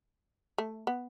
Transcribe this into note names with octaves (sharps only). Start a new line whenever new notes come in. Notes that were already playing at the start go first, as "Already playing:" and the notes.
A3
B3